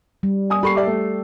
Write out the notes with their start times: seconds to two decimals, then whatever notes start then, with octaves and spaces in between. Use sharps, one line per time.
0.23 G3
0.50 G#5 D#6
0.63 G4 A4 B5 C#6 C7
0.75 D5 E5 D6
0.87 A3